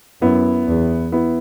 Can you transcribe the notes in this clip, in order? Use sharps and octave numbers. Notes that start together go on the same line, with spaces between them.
F#2 B3 E4
E2
B3 E4